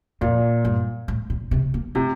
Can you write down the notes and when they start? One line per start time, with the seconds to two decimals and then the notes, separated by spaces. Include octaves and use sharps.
0.21 F2 A#2
0.65 G2
1.08 A2
1.30 A#2
1.51 C3
1.74 A#3
1.95 C3 A3